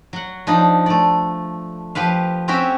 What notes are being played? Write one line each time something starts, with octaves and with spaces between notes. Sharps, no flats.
F#3 F#5
F3 D4 D#4
A3 D5
F3 G4 B4 F5
C4 C#4 F#4 G4 E5 G5